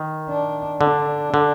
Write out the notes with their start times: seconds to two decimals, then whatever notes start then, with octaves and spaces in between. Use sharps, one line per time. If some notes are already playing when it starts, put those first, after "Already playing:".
Already playing: D#3
0.29 D4
0.81 D3 D4
1.34 D3